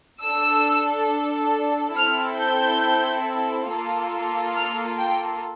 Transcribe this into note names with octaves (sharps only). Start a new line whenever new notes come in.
D4 A4 E6
C4 E4 A4 F6
G6
A#3 F4 A4
F6
G5